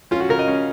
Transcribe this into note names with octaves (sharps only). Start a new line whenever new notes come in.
C#4 F4
F#4
C#3 A#4
D#5
C#4